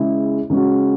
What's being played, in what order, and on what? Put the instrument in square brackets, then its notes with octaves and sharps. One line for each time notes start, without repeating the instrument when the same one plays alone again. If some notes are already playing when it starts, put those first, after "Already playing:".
Already playing: [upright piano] C#3 G#3 E4 G#4
C#3 G#3 C#4 F#4